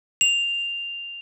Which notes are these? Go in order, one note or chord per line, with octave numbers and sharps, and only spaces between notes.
F7